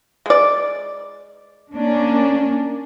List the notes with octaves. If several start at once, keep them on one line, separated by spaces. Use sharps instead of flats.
G#3 D5
A#3 C#4 D4